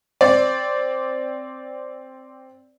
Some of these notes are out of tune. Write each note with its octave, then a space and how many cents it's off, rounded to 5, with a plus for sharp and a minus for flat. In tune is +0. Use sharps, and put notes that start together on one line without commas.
C4 +0 D5 -10